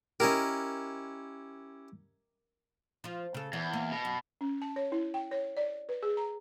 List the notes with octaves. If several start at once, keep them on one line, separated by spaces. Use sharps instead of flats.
C#4 E4 G4 A#4 D#5
F3 F4
C#3 A4
E2 E3
A#3
B2
F#2
C#4
A5
C#5
E4
G5
C#5
D5
B4
G#4
A#5